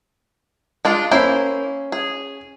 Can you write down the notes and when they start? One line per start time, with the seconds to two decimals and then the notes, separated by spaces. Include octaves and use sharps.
0.85 G#3 D4 F4
1.11 A#3 C#4 E4 C5
1.92 G#4